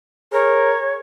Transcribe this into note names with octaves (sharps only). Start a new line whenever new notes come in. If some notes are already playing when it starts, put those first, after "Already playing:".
G#4 A#4 C#5